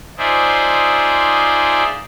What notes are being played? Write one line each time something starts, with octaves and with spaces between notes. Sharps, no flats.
D#4 F4 G#4 C5 D5 E5